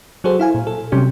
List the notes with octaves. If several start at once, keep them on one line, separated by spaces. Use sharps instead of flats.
F#3 F#4 G#4 A4 C5
E4 F5 G#5
A#2
A4
C3 F#3 G3 C#4 G4